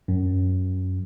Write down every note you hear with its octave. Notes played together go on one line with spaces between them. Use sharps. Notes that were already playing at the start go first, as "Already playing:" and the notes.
F#2